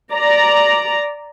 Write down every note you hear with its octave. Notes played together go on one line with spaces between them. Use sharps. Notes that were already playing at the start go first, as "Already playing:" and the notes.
D5 A#5